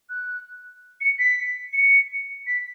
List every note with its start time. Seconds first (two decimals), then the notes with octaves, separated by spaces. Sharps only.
0.09 F#6
1.01 C#7
1.19 B6
1.73 C#7
2.47 B6